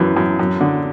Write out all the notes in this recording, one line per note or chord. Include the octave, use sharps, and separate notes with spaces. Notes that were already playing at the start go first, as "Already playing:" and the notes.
Already playing: F#2 E3
F#2
F#2
D3